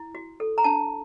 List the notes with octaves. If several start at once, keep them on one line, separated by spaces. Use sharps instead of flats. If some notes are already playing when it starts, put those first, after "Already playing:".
Already playing: E4
F#4
A4
A#5
D4 A5